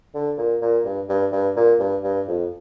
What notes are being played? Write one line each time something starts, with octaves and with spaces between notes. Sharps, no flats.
D3
A#2
A#2
G2
G2
G2
A#2
G2
G2
F2